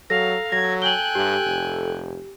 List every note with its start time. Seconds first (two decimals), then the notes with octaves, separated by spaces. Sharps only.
0.10 F#3 A4 F5 A#5 A#6
0.52 F#3 G#6 A#6
0.82 G5 G#5 F#6 F#7 G7
1.15 G2 G4
1.46 F1